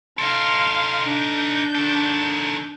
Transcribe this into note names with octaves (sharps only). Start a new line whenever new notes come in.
D#4 A4 F5 C6
D4 G6
D#3 A4